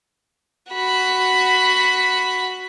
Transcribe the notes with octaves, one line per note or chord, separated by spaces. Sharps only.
F#4 B5